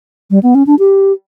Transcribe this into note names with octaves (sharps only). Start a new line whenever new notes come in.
G3
B3
C#4
D4
G4